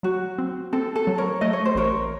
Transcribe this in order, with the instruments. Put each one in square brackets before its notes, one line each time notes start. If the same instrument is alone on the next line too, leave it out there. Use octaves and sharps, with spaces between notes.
[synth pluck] F#3 [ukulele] F#4
[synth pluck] C4
[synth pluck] C4 [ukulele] A4
[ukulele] A4
[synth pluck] F#3
[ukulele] A#4 C#5
[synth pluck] A3 [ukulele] D#5
[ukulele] C#5
C5
[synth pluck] A1 [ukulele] A#4 C#5